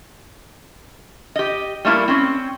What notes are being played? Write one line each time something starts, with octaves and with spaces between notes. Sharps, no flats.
G4 D#5
G3 A3 A#3 E4
C4 C#4